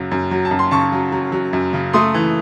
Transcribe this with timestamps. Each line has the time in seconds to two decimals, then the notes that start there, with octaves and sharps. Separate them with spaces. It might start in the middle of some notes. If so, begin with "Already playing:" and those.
Already playing: F#2 C#3 F#3
0.11 F#2
0.31 F#3
0.45 A5
0.51 F#2
0.59 C6
0.71 C#3 A5 C#6
0.92 F#3
1.12 F#3
1.32 F#3
1.53 F#2
1.73 C#3
1.93 A3 C6 D#6
2.14 E3